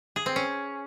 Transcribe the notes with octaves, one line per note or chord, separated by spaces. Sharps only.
G#4
C4
C#4